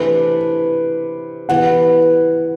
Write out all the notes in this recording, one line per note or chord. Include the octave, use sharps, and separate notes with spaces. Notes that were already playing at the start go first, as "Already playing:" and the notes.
Already playing: C3 E3 A3 D4 B4
E3 G3 B3 F#5